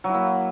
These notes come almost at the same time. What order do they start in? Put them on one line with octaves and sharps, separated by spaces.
F#3 E4 A#3